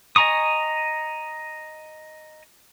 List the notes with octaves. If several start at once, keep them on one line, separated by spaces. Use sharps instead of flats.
D#5 G#5 A#5 C#6 D#6